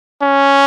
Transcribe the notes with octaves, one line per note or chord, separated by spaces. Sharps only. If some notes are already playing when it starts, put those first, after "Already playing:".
C#4